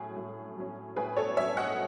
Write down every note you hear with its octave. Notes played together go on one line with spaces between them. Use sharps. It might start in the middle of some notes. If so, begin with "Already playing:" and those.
Already playing: A2 F#3 C#4 G#4
A2
F#3 C#4
A2 G#4 B4
A4 C#5
F#3 C#4 C#5 E5
D#5 F#5